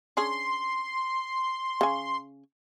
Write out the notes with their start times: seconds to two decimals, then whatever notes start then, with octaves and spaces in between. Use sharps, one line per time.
0.17 C#4 D4 G#4 C6
1.81 C#3 G#5